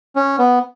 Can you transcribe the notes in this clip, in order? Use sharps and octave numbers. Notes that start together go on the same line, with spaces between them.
C#4
B3